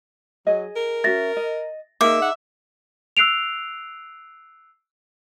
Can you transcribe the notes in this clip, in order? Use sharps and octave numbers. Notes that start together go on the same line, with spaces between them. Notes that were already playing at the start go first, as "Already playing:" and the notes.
F#3 G#4 D#5
A#4
C#4 F#4 E5 A6 A#6
D#5
A#3 D#4 G#4 E5 D6
F#5
E6 F#6 C7 D7 F7